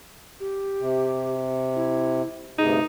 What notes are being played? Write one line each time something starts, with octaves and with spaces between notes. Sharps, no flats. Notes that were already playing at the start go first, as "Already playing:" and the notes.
G4
C3
E4
D2 G2 C3 D#4 G#4